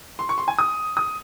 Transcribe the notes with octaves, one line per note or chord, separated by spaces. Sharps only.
C6
C#6
C6
G#5
D#6
D#6